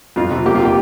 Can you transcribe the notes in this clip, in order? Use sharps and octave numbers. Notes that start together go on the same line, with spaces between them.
F2 F4
C3
A#3 G4
F4
F3 G4